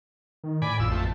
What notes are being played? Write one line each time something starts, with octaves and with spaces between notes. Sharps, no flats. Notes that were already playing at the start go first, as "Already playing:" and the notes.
D#3
A2 D5 G#5 B5
A1 F2 E6
F2 A3